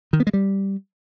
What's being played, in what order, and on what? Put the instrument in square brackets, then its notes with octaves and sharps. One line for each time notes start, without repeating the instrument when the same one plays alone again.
[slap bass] D#3
B3
G#3
G3